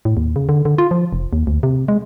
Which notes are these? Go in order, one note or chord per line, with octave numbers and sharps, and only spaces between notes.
A2
D#2
C#3
D3
D3
F4
F3
F1
D#2
D2
C3
G#3